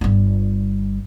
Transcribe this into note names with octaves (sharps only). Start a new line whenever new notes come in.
G1 G3